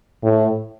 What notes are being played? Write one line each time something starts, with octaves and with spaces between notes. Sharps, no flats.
A2